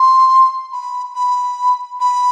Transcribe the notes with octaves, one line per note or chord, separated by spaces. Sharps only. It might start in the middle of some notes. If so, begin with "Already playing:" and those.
Already playing: C6
B5
B5
B5